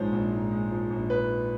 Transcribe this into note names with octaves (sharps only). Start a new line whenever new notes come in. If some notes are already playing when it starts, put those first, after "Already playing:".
Already playing: A#1 G#2 F3 G#3 C5 C#5
A#1
G#2
G#3
F3
A#1
B4